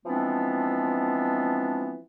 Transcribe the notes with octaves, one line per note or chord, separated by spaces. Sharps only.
E3 F3 G#3 B3 C4 D4